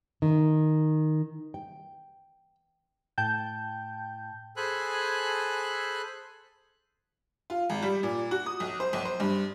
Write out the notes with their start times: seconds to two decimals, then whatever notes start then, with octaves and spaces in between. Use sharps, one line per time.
0.22 D#3
1.54 G5
3.18 A2 G5 A5 G6
4.57 G#4 A4 C5 G#5 B5 F#6
7.50 F4
7.70 G#1
7.82 G3
8.03 A#2
8.31 F#4
8.46 D#6
8.60 B1
8.80 C5
8.93 B1
9.05 C5
9.20 G2